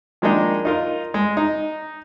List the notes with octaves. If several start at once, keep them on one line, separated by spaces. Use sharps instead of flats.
D#3 F3 G#3 A#3 D4 D#4
D#4 F4 A#4
G#3
D#4